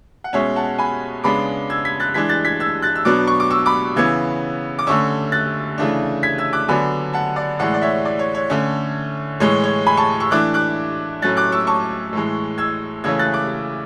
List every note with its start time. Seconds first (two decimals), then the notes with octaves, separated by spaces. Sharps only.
0.24 F#5
0.33 B2 G#3 C#4 C#5 E5
0.56 F#5 A5
0.79 G#5 B5
1.24 C#3 G#3 B3 D4 B5 D6
1.70 E6 G#6
1.85 G#6 B6
2.00 F#6 A6
2.14 E3 G#3 D4 G#6 B6
2.29 F#6 A6
2.45 G#6 B6
2.60 E6 G#6
2.82 F#6 A6
2.96 E6
3.05 B2 F#3 B3 D4 D6 F#6
3.27 C#6
3.40 D6
3.50 C#6 E6
3.66 B5 D6
3.96 C#3 E3 B3 E6 G#6
4.79 D6
4.87 D3 A3 C#4 C#6 E6
5.32 F#6 A6
5.78 C#3 E3 A3 D4
6.23 G#6 B6
6.38 E6 G#6
6.53 D6 F#6
6.68 D3 F#3 B3 D4 G#5 B5
7.13 F#5 A5
7.36 D5 F#5
7.59 A2 E3 G#3 D5 F#5
7.74 D5
7.82 C#5 E5
8.05 D5
8.19 C#5
8.35 C#5
8.50 D3 A3 C#4
9.40 A2 E3 G#3 C#5
9.63 C#5
9.86 G#5 B5
9.97 A5 C#6
10.20 C#6 E6
10.31 E3 A3 D4 D6 F#6
10.54 D6 F#6
11.22 A2 F#3 A3 C#4 F#6 A6
11.37 D6 F#6
11.52 C#6 E6
11.67 A5 C#6
12.13 A2 E3 G#3
12.58 E6 G#6
13.04 C#3 E3 A3 C#4 E6 G#6
13.19 F#6 A6
13.33 D6 F#6